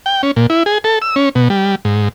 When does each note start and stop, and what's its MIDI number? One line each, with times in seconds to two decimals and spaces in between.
0.06 0.22 79
0.23 0.31 61
0.36 0.47 46
0.50 0.63 64
0.66 0.78 68
0.84 0.99 69
1.02 1.15 88
1.16 1.29 61
1.35 1.48 47
1.50 1.75 55
1.85 2.09 44